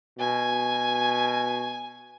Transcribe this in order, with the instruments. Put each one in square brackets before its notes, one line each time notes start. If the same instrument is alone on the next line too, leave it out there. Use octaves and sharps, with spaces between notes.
[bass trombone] B2 [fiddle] G#5